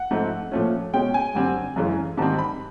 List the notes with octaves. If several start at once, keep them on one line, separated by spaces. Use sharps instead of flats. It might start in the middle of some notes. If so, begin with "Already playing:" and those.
Already playing: F#5
G#2 F3 A3 C4
A#2 F3 A3 C#4
B2 G#3 C#4 G5
G#5
F#2 D3 G3 C4
F#2 C#3 E3 G#3
G#2 D#3 G3 C4 A5
B5